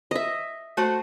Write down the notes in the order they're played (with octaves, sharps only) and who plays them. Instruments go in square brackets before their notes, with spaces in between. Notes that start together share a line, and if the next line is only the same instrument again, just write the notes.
[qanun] D#5 E5
[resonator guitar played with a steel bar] A3 F#4 C5